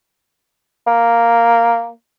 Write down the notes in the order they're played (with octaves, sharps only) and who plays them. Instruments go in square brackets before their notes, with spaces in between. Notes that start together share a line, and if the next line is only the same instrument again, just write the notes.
[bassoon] A#3